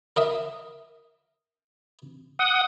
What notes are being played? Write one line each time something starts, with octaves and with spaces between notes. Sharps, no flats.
A#4 D#5 E5
F#5 D#6